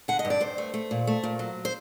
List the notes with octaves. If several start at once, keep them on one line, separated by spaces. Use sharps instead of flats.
D3 F#5
D#5
G2
D5
G2 C5
A3
A3
A#2
A3
A#2
F#3
C5